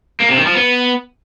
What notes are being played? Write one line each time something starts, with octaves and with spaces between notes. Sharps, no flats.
A#3
C3
D#3
F3
B3